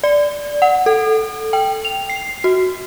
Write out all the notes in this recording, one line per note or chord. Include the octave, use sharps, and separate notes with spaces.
D5
F#5
A4
G5
F7
C7
F#4